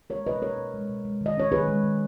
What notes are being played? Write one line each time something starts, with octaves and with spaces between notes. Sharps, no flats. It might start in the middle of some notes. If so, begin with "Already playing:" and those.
G#3 A#4 C#5
B2 B4 D#5
C#4 A#4 C#5
B2
G#3
B2
G#3
D#3 D#5
C#4 C#5
D#3 G#4 B4
G#3
D#3